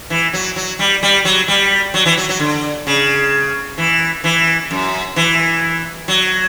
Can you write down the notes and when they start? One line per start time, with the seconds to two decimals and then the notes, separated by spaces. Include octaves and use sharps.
0.10 E3
0.33 F#3
0.56 F#3
0.79 G3
1.03 G3
1.25 F#3
1.48 G3
1.94 F#3
2.06 E3
2.17 F#3
2.29 F#3
2.40 D3
2.87 C#3
3.78 E3
4.24 E3
4.71 F#2
5.16 E3
6.08 F#3